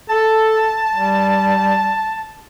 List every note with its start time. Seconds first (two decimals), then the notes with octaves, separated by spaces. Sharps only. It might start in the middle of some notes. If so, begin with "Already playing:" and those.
0.10 A4 A5
0.96 G3